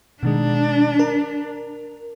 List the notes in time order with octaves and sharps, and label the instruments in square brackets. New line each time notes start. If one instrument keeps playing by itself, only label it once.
[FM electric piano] B2 D#3 G#3 [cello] D4
[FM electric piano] A#4